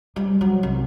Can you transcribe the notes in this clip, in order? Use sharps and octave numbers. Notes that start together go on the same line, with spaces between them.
G3
F#3
C2